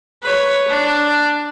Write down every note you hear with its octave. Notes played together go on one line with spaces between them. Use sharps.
B4 C#5
D4